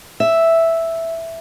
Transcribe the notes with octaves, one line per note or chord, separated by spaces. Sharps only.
E5